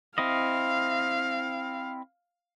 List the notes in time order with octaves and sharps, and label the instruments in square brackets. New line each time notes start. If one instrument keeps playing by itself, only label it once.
[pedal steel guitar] C4 E4 D#5 [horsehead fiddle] F5